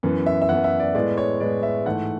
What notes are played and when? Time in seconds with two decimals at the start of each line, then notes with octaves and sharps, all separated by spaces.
0.03 F#2 E3 B3
0.26 E5
0.42 E5
0.49 F#2 E3 B3 F#5
0.64 E5
0.80 D5
0.95 A2 G#3 B3 D5
1.18 C#5
1.40 A2 G#3 B3 D5
1.63 E5
1.85 G#2 E3 A3 F#5